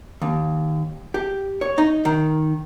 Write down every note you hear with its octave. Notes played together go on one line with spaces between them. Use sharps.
D#2
G4
C#5
D#4
D#3